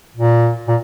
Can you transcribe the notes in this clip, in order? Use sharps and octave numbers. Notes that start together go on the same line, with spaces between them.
A#2
A#2